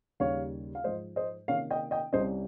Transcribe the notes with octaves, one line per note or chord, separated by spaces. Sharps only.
D#2 C#3 G3 C#5 F5
F5
G#2 F3 G#3 C5 D#5
C5 D#5
C3 D#3 A#3 C#4 C#5 F5
D#5 G5
D#5 G5
C2 C3 G3 C#4 C5 D#5